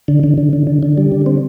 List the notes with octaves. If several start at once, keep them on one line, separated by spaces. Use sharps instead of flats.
D3
D3
D3
D3
D3
D3
G3
D3
C4